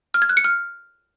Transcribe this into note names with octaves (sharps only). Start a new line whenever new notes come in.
F6
G#6
F#6
C#7
F6